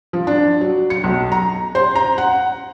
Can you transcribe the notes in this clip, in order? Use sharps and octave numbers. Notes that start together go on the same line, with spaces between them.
F3
D4
F#3
C#7
B1
A#5
C5
A#5
F#5